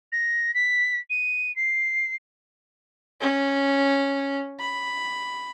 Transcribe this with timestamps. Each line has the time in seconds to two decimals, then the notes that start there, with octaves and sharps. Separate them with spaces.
0.12 A#6
0.54 B6
1.09 D#7
1.56 C7
3.21 C#4
4.60 B5